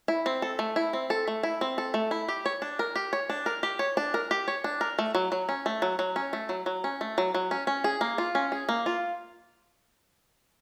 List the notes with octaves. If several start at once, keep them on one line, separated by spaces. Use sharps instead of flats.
E4
C4
A4
A3
E4
C4
A4
A3
E4
C4
A4
A3
E4
G4
C#5
D4
A#4
G4
C#5
D4
A#4
G4
C#5
D4
A#4
G4
C#5
D4
A#4
A3
F#3
F#3
C#4
A3
F#3
F#3
C#4
A3
F#3
F#3
C#4
A3
F#3
F#3
C#4
C#4
G#4
A#3
F4
C#4
G#4
A#3
F4